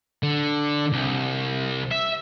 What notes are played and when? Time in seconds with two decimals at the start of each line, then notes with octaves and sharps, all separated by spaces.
0.23 D3
0.92 C2
1.92 E5